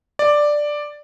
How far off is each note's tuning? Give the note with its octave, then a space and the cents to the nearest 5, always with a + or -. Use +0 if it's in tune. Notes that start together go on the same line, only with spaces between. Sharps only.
D5 +5